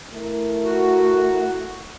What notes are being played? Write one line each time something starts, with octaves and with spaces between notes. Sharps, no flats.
A3 E4 A#4
F#4